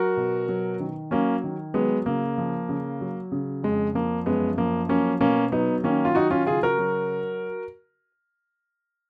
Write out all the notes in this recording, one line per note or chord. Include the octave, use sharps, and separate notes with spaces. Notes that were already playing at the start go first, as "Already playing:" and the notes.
Already playing: F#3 F#4 A#4
B2
F#3
D#3
F#3 A#3 C#4
D#3
F#3 G#3 B3
C#3 A#3
F3
C#3
F#3
C#3
F2 G#3
F3 A#3
F#2 G#3 B3
F3 A#3
F#3 A#3 C#4
B2 A#3 C#4
F#3 B3 D#4
D#3 A#3 C#4
F4
F#3 D#4 F#4
C#4 F4
C#3 F4 G#4
F#4 A#4
F#3